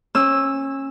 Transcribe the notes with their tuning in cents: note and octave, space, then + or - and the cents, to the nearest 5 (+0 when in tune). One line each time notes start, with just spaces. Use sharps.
C#4 -25 E6 +0